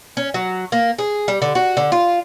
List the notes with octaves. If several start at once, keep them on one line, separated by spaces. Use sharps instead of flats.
C#4
F#3
A#3
G#4
G3
D3
F#4
D3
F4